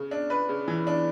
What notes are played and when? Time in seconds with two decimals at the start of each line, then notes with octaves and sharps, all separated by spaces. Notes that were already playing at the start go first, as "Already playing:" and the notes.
Already playing: C#3
0.11 D4
0.30 D4 B4
0.49 C#3
0.68 E3
0.87 D4